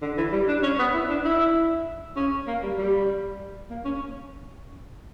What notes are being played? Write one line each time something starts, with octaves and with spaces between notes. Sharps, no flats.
D3
E3
G3
D4
C#4
B3
E4
D4
E4
C#4
A#3
G3
G3
A#3
C#4